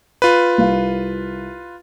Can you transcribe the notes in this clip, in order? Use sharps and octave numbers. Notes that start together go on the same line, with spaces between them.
F4 B4
C2 F5